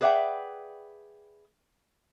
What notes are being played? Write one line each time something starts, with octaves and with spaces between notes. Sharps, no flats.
G#4 B4 D5 E5 F#5 G5